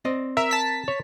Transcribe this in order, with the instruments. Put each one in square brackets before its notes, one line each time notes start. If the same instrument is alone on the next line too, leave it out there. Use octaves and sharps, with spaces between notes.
[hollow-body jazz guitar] C4 D5 D#5
[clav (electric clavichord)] A#4 [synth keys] E5
[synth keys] A5 B6
[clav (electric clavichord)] C#5